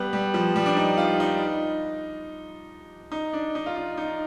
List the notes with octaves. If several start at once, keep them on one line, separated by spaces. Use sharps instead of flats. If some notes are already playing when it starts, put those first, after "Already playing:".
Already playing: G3 B3
G3
F3
G3
D4
D#4
F4
D#4
D#4
D4
D#4
F4
D#4
D#4